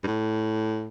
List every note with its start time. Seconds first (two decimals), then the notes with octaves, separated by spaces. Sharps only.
0.03 G2
0.07 A2